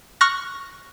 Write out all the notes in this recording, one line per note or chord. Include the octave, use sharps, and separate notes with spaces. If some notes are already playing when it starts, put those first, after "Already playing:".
C#6 F6 F#6 A#6